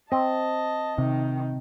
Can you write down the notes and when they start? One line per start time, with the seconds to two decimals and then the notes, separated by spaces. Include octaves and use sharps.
0.12 C4 D#5 A5
0.98 C3 D#3